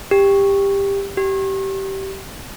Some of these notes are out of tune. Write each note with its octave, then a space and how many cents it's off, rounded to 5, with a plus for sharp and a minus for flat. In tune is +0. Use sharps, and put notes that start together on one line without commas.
G4 +15
G4 -20